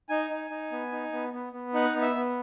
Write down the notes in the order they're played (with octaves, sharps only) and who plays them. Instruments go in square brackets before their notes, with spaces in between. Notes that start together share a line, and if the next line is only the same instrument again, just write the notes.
[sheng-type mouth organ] D#4 G#5
D#4
D#4
B3
D#4
B3
B3
B3
D#4 F#5
B3
E5
B3